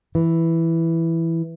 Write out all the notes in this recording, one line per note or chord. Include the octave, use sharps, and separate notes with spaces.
E3